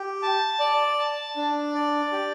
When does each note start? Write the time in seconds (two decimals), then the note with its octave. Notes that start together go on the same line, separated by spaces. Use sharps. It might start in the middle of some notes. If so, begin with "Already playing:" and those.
Already playing: G4
0.22 A5
0.60 D5
0.99 A5
1.36 D4
1.74 D5
2.12 G4